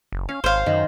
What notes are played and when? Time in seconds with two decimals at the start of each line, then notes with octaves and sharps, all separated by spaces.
0.12 F#1
0.29 C#4 F5
0.44 G#1 C5 C#5 F5 C6
0.66 F#2 D#3